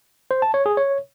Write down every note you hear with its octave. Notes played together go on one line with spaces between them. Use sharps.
C5
A5
C#5
G#4
C#5